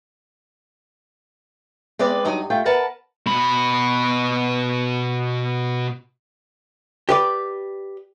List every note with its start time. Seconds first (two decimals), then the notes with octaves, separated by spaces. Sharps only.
1.99 G#3 C4 B4 D5
2.25 G2 F#3 D#4 D#5
2.50 A3 F4 G5
2.65 A#4 B4 F#5 A5 A#5
3.26 B2 B5
7.09 G4 B4 D5